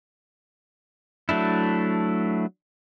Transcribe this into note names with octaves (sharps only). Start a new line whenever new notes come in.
F#3 A3 D4 E4